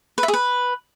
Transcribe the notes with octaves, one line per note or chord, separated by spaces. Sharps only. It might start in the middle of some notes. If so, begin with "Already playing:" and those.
B4
E5
G#4
B4